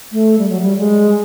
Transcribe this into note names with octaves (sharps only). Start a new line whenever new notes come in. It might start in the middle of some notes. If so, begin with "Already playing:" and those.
A3
G3
F#3
G3
G#3